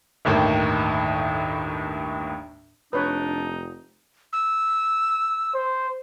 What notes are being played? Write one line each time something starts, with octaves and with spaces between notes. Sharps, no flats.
G1 D#2 A2 D#3
F1 D4 D#4 B4 C#5
E6
C5